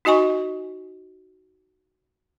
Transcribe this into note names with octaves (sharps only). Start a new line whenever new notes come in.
D#4 F#4 D#5 G#5 C#6